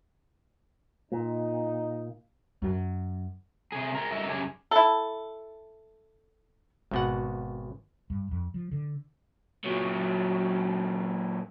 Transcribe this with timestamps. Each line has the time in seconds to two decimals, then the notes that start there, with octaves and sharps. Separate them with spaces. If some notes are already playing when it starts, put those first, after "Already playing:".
1.12 A#2 D#4
2.62 F#2
3.72 C3 G#4
3.95 G#4 A#4
4.10 G2 A3 D#4 A#4 E5
4.28 F#2 C#3 D4 G4 G#5
4.71 E4 A4
6.91 G#1 B2 F#5
8.10 G2
8.31 F2
8.54 F3
8.72 D3
9.64 A#2 F#3